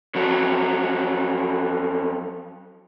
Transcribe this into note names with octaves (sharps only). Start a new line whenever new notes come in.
F2 F#3